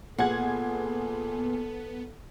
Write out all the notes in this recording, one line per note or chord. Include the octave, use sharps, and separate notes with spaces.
A#2 B3 G#4 A4 F#5 G#6